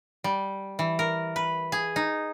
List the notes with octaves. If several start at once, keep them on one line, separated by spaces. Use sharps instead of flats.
G3
E3
A#4
B4
G#4
D#4